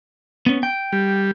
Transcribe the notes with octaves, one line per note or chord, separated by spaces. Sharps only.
B3 C#4
G5
G3